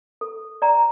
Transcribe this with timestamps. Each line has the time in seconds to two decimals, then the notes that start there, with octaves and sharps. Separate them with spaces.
0.21 A4
0.62 D5 G5 A#5